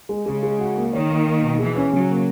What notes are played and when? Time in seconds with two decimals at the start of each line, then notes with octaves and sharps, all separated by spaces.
0.09 G#3
0.26 C#3 G#3
0.43 G#3
0.59 F#4
0.76 A#3
0.92 D#3 C#5
1.10 A#3
1.26 A#3
1.42 B2
1.58 E3 G#4
1.76 C#4
1.93 C#3 F#3
2.09 A#3